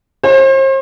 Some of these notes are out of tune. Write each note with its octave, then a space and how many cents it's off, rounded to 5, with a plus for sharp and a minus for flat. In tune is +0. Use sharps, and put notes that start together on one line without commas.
C5 +40